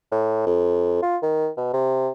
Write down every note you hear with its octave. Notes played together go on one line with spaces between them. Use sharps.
A2
F2
F4
D#3
B2
C3